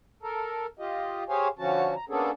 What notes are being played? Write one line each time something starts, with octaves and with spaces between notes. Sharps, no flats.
A4 A#4
F4 G4 D#5
G4 G#4 C5 C#5 F5 G#5
D3 F3 C#4 F#4 A5
A#5
A#3 B3 C#4 D4 G#4 A4